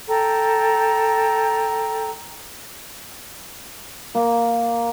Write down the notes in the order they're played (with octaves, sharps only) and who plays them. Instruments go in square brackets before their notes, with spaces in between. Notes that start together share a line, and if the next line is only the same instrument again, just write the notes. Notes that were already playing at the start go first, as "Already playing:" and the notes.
[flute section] A4 G5 A#5
[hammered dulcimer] A#3